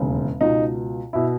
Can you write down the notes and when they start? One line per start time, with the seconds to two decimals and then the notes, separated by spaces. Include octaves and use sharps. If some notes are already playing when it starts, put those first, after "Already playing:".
Already playing: E1 D#2 C#3
0.41 C#2 B2 D#4
1.13 B2 E4